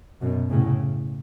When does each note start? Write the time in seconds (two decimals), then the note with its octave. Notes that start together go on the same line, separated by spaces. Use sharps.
0.21 F#2 B2
0.50 A2 C#3